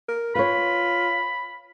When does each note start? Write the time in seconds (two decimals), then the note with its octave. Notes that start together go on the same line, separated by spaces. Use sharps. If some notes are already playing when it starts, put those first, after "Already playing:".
0.08 A#4
0.35 F4 B4 C#5 B5